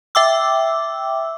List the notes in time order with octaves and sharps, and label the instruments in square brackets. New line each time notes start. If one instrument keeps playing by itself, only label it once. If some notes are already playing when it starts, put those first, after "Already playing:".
[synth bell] E5 G5 D6 E6